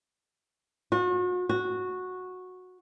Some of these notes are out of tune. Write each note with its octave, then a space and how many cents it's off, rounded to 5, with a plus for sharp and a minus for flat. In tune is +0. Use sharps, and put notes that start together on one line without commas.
F#4 -40
F#4 -10